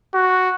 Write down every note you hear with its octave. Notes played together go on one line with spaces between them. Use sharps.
F#4